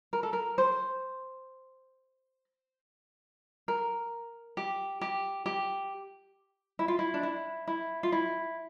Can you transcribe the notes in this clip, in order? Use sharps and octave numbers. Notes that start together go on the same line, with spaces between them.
A#4
A4
A#4
C5
A#4
G4
G4
G4
E4
F4
E4
D4
E4
E4
F4
E4